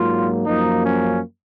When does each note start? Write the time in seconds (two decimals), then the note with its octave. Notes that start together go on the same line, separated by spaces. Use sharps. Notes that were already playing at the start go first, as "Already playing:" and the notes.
Already playing: G#2 F#3 A#3 F4
0.46 F#2 F3 A#3 D#4
0.85 C#4